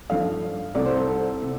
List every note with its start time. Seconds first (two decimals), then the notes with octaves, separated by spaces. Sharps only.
0.10 G2 F3 A3 F5
0.75 C2 C3 A3 D5
0.86 C5
0.96 A4
1.07 A4
1.42 C3